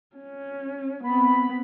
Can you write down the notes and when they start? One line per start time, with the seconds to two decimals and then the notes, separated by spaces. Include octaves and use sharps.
0.16 C#4
1.04 B3 C4 B5